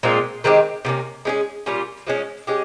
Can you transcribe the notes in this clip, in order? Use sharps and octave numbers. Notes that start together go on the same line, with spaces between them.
A#2 G#3 C4 F4
D#3 G#3 C4 G4
C3 F3 A#3 C#4
G#3 C#4 F4 G#4
A#2 G3 C#4 F4
F3 G#3 C#4
G#3 C#4 G4